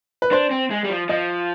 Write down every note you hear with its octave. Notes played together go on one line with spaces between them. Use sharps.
B4
D4 C5
C4
G#3
G3
F3
F3 D#5